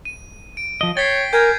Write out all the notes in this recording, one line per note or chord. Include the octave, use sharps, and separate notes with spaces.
D#7
D7
F3 D#5
C#5 G5 A6 B6 C7
A#4 G#5 G6 G#6